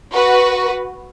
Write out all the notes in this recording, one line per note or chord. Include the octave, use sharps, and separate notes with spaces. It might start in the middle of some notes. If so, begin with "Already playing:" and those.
F#4 B4